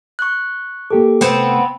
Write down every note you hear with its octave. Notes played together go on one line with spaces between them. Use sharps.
C#6 F#6
A#3 G4 A4 D6
C3 A3 B3 C4 G5